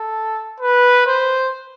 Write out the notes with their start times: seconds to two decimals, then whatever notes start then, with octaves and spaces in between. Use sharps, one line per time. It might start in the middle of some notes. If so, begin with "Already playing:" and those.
Already playing: A4
0.60 B4
1.07 C5